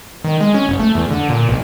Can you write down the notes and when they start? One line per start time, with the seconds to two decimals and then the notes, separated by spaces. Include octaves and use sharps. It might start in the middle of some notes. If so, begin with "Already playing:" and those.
0.24 D#3
0.41 G#3
0.54 C#4
0.68 F#1
0.80 A3
0.95 E2
1.11 D3
1.29 A#2
1.49 B1